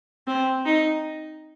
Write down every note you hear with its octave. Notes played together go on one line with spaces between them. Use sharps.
C4
D#4